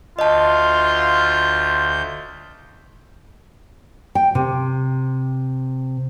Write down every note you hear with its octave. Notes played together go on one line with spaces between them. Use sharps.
D2 F4 D#5 A5 G6
G5
C3